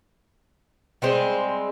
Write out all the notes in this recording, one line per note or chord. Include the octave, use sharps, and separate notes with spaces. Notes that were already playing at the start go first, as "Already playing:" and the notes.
G3 G#3 C4